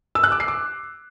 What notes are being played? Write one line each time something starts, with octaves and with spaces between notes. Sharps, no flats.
E6
F#6
D6
C7
D6